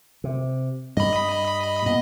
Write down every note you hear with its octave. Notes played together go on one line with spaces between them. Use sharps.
C3
G2 G3 D#5 B5
A#2 B3 D#5